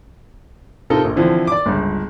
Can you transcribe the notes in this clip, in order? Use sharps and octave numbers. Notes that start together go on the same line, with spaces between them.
C3 D#4 F4 A4 A#4
A#1
D3 E3 F3 C4
D5 D6
G1 C#2